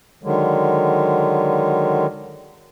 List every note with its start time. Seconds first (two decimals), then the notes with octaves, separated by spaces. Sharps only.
0.23 D3 D#3 F#3 G#3